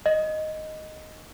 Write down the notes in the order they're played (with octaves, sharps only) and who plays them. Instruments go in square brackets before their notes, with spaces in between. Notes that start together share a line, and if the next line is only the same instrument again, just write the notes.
[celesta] D#5